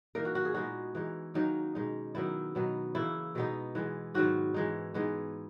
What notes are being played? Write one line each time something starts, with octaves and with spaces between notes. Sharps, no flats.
E3 A#3 D#4 A#4
F#4
F#4
G#4
A#2 G#3 B3 D#4 F#4
E3 G#3 D#4
D#3 F#3 A#3 C#4 D#4
B2 G#3 D#4
D#3 F#3 B3 D#4 E4
B2 F#3 B3 D#4
C#3 E3 A#3 E4
B2 G#3 B3 D#4
E3 G#3 B3
G#2 D#3 F#3 B3 F#4
E3 G#3 D#4
E3 G#3 B3 D#4